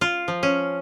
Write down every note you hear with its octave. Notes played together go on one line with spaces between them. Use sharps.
F4
F3
C#4